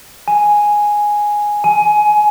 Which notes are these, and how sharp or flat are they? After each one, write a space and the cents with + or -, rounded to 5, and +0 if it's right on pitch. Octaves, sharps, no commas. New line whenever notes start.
G#5 +0
G#5 +20